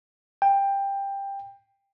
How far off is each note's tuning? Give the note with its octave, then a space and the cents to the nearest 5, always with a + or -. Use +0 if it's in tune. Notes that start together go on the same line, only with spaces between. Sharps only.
G5 +15